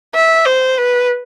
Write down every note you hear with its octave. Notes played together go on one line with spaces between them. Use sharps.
E5
C5
B4